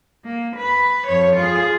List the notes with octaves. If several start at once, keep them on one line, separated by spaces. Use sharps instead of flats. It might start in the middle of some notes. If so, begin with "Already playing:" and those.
A#3
B4
F2 C#5
F4 G#4